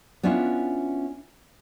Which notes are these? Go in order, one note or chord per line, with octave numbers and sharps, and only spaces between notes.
B3 C#4 D4 E4 F4